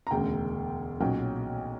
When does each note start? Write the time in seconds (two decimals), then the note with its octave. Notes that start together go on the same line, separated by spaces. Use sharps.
0.07 A#5
0.11 E1 D2 C#3 G5
1.00 B1 A#2 F#3 C#4 G5